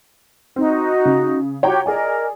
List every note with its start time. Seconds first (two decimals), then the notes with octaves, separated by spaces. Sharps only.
0.56 C4 D#4 F#4
1.05 C#3
1.63 F#4 G4 C#5 F#5 G5 A#5
1.86 G#4 A#4 D5 D#5 G#5